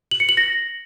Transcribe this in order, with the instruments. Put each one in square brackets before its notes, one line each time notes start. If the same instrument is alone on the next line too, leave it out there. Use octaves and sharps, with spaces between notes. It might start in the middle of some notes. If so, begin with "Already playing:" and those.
[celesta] F#7
C#7
F#7
A#6